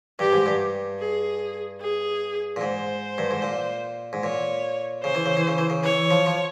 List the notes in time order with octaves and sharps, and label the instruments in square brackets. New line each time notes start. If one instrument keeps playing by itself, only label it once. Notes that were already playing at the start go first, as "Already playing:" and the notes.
[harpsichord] G2 [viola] G4
[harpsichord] G#2
G2
[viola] G#4
G#4
[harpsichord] A#2
[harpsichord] G#2 [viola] C5
[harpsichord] G2
G#2
A#2
G#2
[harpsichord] A#2 [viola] C#5
[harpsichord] C#3 [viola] C5
[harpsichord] E3
C#3
E3
C#3
E3
C#3
[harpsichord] E3 [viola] C#5
[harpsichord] F3
F3